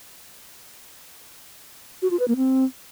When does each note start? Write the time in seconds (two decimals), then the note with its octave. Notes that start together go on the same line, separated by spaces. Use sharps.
2.02 F#4
2.11 F4
2.19 B4
2.28 A#3
2.37 C4